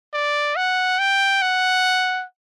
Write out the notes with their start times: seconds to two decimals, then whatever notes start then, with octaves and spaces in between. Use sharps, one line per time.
0.13 D5
0.56 F#5
0.99 G5
1.42 F#5